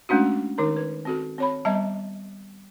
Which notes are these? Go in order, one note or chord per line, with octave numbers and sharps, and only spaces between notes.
G#3 A3 C#4 D4 F#4
D#3 D#4 A#4 A#5
B4
C4 F#4 A4
C4 C#5 B5
G3 B3 D#5 E5 A5 A#5